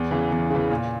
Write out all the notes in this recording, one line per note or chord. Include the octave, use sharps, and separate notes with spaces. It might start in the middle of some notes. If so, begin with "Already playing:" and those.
Already playing: E2
C#3 E3
E2
C#3 E3
A#2